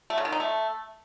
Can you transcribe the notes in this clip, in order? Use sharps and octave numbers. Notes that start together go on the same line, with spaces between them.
A3
C#3
D#3
D#4
A3